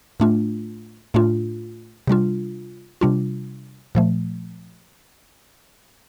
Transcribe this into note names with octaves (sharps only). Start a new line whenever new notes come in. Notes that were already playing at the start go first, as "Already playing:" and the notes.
A2 A3 D4 F4
A2 A3 D4 F4
C3 G3 D4 F4
C3 G3 D4 F4
A#2 F3 A3